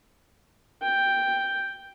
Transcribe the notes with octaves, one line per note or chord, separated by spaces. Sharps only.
G5